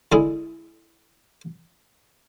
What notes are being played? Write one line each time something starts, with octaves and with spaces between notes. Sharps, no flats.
D3 G#3 E4 G#4